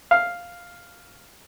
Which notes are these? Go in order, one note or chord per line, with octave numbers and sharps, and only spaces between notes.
F5